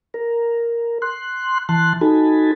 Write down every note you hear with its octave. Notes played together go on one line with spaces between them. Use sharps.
A#4
C6 F#6
E3 A5 C6 F#6
D#4 F#4 A4 G#5 A5 B5